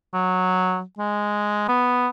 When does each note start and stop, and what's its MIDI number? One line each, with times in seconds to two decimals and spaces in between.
0.14 0.82 54
0.98 1.65 56
1.68 2.08 59